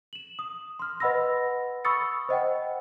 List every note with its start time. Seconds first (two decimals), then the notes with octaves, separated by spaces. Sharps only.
0.13 E7 F#7
0.39 D#6
0.79 C6 F6
1.00 B4 D#5 F#5 B5 E6 A#6
1.85 B5 C#6 D#6 E6 A6 C#7
2.29 C5 D#5 F#5 G5